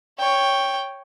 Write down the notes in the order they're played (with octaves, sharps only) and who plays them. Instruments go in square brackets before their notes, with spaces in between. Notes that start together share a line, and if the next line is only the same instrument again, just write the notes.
[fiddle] C#5 G5